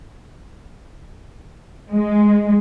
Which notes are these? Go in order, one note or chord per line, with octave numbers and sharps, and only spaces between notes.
G#3